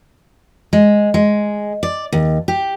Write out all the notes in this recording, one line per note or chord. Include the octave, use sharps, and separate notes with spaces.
G#3
G#3
D5
D#2
G4